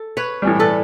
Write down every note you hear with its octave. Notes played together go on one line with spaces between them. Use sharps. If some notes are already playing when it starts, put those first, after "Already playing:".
Already playing: A4
B4 C#5
A2 E3 G3
A4 B4